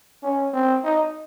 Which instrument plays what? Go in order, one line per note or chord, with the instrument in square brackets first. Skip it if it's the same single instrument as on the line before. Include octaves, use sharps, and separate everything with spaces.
[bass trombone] C#4
C4
D#4